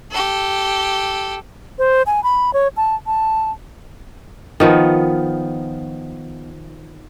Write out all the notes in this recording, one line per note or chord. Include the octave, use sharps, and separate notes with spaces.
G4 A4
C5
G#5
B5
C#5
A5
A5
D#3 F3 B3